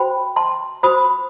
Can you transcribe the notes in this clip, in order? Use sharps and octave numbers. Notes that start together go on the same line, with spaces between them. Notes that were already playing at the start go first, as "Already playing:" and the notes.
Already playing: F#4 C5 G5 B5
A5 C6
F#4 C5 B5 D#6